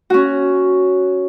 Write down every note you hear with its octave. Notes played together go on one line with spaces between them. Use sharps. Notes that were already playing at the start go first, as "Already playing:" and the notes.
C#4 F#4